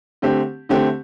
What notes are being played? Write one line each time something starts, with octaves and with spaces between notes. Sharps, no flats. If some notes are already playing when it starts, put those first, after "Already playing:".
D3 A3 C4 G4
D3 A3 C4 G4